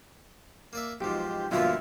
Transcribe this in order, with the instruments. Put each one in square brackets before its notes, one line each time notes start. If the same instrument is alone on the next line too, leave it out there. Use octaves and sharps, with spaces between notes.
[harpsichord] A#3 D5 E5
[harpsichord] B1 G#2 F3 [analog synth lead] G4
[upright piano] G2 B2 [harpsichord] D3 F3 A#3 [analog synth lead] F4 [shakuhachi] E5